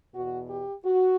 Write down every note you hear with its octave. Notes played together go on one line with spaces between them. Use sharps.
E2 B2 F#4
G4
F#4